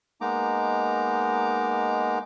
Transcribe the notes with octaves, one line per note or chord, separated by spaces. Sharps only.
G#3 A#3 B3 D#4 A#5 D6